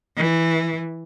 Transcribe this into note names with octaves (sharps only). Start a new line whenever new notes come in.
E3